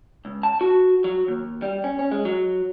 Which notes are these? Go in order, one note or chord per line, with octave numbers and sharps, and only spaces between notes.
C#2
A5
F#4
F#3
D#2
G3
C#4
C#4
G#3
F#3